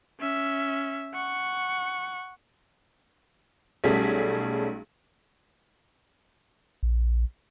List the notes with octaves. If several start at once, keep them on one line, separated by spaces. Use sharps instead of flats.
C#4 E5
F#5 C#6
B1 G3 A3 C#4 G#4 B6
A#1